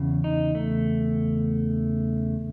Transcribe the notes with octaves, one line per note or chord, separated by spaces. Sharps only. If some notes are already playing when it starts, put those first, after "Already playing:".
Already playing: E2 C#3
D#4
A3